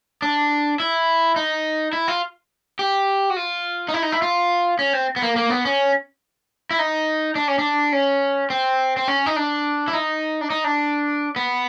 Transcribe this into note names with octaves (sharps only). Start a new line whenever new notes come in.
D4
E4
D#4
E4
F4
G4
F#4
F4
D#4
E4
D#4
E4
F4
C#4
C4
B3
A#3
A#3
B3
C#4
E4
D#4
D4
C#4
D4
C#4
C4
C4
C#4
D#4
D4
E4
D#4
D4
D#4
D4
B3